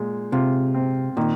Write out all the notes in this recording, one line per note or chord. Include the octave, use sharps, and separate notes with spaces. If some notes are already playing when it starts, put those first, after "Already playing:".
Already playing: A#2 G#3
C3 F4
C4
A#2 D#3